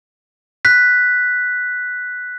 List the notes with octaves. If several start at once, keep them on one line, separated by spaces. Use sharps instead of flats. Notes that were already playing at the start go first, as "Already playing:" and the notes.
F#6 B6